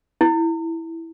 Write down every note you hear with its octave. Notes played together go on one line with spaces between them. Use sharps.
E4